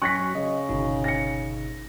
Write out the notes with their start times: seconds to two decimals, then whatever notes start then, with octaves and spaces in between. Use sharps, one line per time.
0.02 F#2 F#4 G#5 C#6 F#6 A#6 B6
0.35 C#3 D#5
0.69 G1 B2 D#4
1.04 A#6 C#7